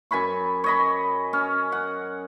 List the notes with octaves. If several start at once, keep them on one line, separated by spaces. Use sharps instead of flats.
F#2 G#5 B5 C#6
C#5 D#5 B5
C#4
F#5